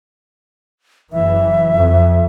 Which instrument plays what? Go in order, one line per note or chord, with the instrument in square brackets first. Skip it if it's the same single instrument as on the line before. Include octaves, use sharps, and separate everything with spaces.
[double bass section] F#1 E3 [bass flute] E5
[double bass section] F2